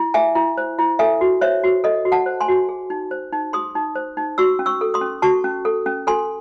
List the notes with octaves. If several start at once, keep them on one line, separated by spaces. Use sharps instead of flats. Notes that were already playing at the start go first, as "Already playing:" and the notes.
Already playing: E4
G#4 E5 G#5
E4
C5
E4
A4 E5 G#5
F#4
C5 C#5 E5
F#4
A4 D#5
F#4
F#5 A5
C5
G#5 C6
F#4
G#4
D#4
C5
D#4
G#4 C6 D#6
D#4
C5
D#4
F#4 C#6 E6
C#4
C#6 E6
A4
C6 D#6
C#4
F#4 A5 C#6
C#4
A4
C#4
A4 G#5 C6